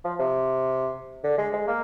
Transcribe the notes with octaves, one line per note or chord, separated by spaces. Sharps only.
F3
C3
D3
G#3
G#3
A#3